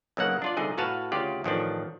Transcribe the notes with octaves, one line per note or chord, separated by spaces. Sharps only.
B1 C#3 A#3 F#5
D4 F4 D5
C2 D3 D#4 G#4
A2 F#4 B4 F5 A5
D2 C#3 F4 G4 D5
A1 D#3 F3 D4